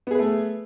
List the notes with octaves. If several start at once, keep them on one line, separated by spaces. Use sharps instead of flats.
A3 B3 G#4 B4